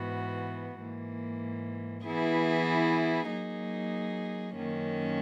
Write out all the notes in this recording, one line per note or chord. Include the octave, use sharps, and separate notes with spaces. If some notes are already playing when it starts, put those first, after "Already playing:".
Already playing: G#2 E3 B3 F#4
G#2 E3 A#3
E3 B3 E4 G#4
F#3 A#3 D#4 G#4
F#2 D#3 A#3 C#4